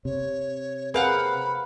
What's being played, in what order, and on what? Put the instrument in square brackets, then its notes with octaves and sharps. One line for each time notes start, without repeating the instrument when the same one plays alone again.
[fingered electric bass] C3 [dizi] C#5
[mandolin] C4 F5 F#5 [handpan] G#4 A#4 B4 [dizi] B5